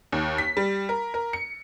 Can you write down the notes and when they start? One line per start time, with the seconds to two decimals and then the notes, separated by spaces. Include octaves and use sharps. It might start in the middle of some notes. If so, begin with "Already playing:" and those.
0.12 D#2
0.38 B6
0.57 G3
0.89 A#4
1.14 A#4
1.33 C#7